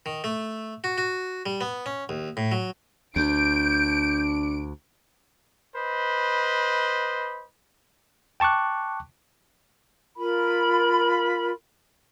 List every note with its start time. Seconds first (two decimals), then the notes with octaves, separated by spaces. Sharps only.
0.06 D#3
0.24 A3
0.84 F#4
0.98 F#4
1.46 G3
1.61 B3
1.86 C#4
2.09 D#2
2.37 A2
2.52 F#3
3.16 D2 D4 G6 D7
5.75 B4 C5 D#5 B5
8.40 G5 A5 C#6 D6 F#6
10.15 F4 A#4 B5